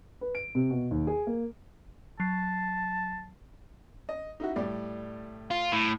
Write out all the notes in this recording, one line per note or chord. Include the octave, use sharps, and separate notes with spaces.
B4
D7
C3
B2
D#2
G#4
A#3
F#3 A5 C7
D#5
D#4 E4 F#4
A2 G3 D5
F4
A2